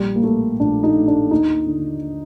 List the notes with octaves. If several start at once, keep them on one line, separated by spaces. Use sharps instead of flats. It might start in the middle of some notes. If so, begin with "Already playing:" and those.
Already playing: A#1 G3
A#3
A2 A3
A#1 D4
D#4
A2
D4
D#2 D#4
D3